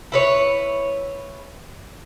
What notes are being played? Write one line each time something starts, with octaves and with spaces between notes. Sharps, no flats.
E4 B4 C#5